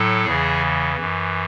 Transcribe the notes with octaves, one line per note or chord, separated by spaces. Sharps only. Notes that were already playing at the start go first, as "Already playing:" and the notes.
Already playing: A2 F#3 A4
E2 C#3 E3 G#4
F#2 E3